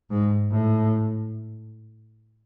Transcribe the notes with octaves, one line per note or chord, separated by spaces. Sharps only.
G#2
A2